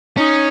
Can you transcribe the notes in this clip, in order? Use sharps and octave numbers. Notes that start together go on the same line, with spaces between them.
C#4 D#4